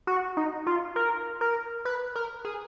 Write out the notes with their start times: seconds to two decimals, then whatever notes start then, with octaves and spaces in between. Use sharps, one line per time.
0.07 F#4
0.37 D#4
0.67 F4
0.96 A#4
1.41 A#4
1.85 B4
2.15 A#4
2.45 G#4